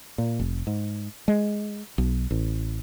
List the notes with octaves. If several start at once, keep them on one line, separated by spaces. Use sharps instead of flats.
A#2
F1
G#2
G#3
B1
A1